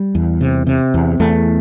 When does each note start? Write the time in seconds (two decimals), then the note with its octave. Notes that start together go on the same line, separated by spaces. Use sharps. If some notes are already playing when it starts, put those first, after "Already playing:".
Already playing: G3
0.15 E2
0.41 C3
0.67 C3
0.94 E2
1.20 E2 A3